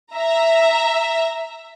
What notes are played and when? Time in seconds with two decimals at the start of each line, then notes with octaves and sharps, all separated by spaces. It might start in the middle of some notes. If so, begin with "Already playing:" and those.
0.14 E5 A#5